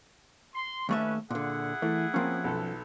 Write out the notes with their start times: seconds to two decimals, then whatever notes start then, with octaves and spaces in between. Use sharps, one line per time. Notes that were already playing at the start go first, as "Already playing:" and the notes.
0.54 C6
0.89 D#2 A3 C#4 B4 E5
1.31 A#2 D3 E4 G#4 F#5
1.82 E3 A3
2.14 F3 A#3 C4 C#4
2.44 B1 A4